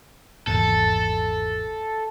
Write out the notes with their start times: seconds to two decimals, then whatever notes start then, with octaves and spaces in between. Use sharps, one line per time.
0.47 G#1 E2 A#2 A4